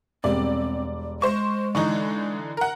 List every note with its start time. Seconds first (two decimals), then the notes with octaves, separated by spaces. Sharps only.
0.24 E1 G3 C4 D5
1.22 G#3 C5 C#6
1.75 D3 E3 D#4 C#6
2.57 A#4 F#5